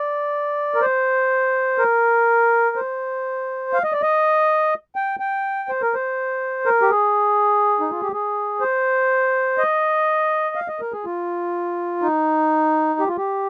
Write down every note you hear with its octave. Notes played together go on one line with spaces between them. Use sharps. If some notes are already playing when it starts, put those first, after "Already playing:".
Already playing: D5
A#4
C5
A#4
C5
F5
D#5
D5
D#5
G5
G5
C5
A#4
C5
A#4
G4
G#4
D#4
F4
G4
G#4
C5
D#5
F5
D#5
A#4
G#4
F4
D#4
G4
F4
G4